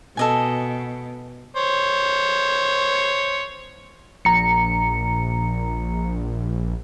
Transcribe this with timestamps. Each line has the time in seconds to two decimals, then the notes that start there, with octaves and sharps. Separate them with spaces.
0.17 B2 A4 D#5 G#5
1.56 C5 C#5
4.25 A#1 A#5 C#7